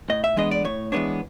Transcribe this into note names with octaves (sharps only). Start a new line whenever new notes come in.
A2 D#5
E5
E3 G#3 B3 D4 D#5
D5
A2 C#5
E3 G#3 B3 D4 C#5